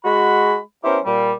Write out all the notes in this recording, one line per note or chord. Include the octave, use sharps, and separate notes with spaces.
G#3 F#4 B5
B3 C#4 E4 G4 A#4 C5
A#2 G3